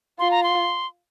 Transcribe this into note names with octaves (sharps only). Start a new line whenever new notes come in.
F4 C6
A#5
C6